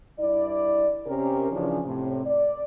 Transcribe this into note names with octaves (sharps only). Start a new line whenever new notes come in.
G2 E4 D5
C3 C#4 G4 A#4
C#3 E3 F3 C#4 D4
A2 C3
D5